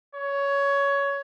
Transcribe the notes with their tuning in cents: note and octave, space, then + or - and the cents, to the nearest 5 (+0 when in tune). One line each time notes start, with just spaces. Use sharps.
C#5 +15